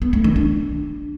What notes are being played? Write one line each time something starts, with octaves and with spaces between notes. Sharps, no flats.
B3
A3
D#3
D4